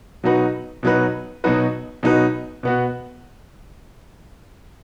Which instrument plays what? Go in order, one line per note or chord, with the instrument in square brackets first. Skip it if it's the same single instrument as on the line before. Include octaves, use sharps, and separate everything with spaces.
[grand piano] B2 F#3 D#4 F#4 B4
B2 F#3 D#4 F#4 B4
B2 F#3 D#4 F#4 B4
B2 F#3 D#4 F#4 B4
B2 B3 F#4